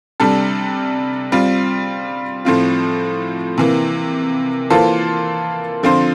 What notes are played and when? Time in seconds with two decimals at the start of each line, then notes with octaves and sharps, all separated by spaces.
0.20 C3 G3 D4 A4
1.32 G3 C4 F4
2.45 A2 F3 C4 F4
3.58 C3 E3 A#3
4.70 E3 A#3 F4 A4 C5
5.83 D3 F3 C4 F4 C5